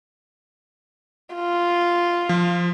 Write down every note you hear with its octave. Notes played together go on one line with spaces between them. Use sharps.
F4
F3